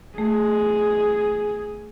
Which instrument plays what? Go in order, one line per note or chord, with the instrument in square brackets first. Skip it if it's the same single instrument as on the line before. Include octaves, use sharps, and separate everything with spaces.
[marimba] A3 [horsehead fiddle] G#4